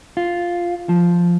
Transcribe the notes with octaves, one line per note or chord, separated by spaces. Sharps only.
F4
F3